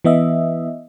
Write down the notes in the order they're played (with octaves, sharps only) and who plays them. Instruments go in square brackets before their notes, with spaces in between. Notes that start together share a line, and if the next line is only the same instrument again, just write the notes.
[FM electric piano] E3 B3 D#5 E5